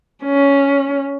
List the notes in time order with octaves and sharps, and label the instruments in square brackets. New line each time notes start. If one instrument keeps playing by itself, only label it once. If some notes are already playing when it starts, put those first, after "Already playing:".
[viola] C#4